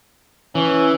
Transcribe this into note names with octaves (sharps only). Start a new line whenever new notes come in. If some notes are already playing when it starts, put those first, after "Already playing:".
E3 C#4